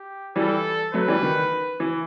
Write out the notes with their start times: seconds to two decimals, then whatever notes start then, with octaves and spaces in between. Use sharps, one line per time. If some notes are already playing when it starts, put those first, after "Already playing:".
Already playing: G4
0.36 E3 G3 A4
0.94 F#3 A3 B4
1.08 E3 G3
1.23 D#3
1.80 E3